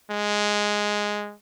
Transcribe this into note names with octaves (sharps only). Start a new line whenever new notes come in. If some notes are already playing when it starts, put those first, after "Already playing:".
G#3